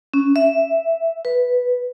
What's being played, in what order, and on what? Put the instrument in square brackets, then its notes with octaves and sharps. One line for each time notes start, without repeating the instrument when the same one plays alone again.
[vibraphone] C#4
E5
B4